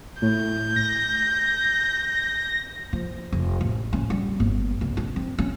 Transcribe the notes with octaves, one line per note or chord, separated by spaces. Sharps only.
A2 G6
A#6
F3
F1
A1
C#4
G3
G1
C2
D4
C4
C#4